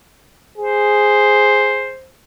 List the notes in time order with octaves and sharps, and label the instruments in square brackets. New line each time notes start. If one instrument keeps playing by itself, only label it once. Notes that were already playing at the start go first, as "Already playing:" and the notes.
[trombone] G#4 [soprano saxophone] C5